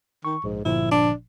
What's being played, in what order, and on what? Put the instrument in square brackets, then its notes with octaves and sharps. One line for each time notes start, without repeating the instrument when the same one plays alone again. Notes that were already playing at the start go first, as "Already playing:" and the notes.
[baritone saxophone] D#3 [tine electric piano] C#6
[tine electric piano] A#1 [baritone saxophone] G#2
[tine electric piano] G1 A#2 F3 [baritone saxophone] E4
[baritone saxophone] D4